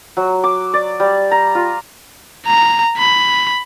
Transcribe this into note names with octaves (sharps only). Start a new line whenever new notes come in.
F#3
D6
D5
G3
A#5
F4
A#5
B5